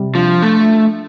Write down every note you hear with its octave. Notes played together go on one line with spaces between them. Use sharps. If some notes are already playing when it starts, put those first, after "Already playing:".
Already playing: C3 G3
F3 D4
A3